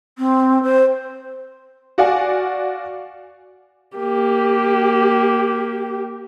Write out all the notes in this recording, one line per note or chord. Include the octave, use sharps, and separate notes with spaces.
C4
C5
F#4 D5 F5 F#5 G#5
A#3 G4